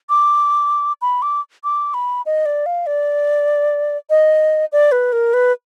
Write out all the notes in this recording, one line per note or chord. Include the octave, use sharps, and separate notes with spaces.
D6
B5
D6
D6
B5
D#5
D5
F5
D5
D#5
D5
B4
A#4
B4